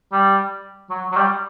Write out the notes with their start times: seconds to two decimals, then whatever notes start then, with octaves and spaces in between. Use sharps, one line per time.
0.12 G3
0.90 F#3
1.12 F#3
1.17 G3